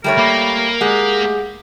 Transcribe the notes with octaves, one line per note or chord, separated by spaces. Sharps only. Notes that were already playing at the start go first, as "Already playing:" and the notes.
G3 A3 A#4 C#5
A#3 B5 D6
G#3 G4 G#4 F#5